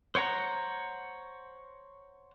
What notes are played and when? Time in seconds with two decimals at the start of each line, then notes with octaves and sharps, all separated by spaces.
0.15 C5 C#5 F#5 A#5